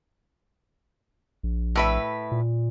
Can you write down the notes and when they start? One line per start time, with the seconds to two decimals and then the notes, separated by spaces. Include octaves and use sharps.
1.43 A#1
1.75 A2 B4 E5
2.32 A#2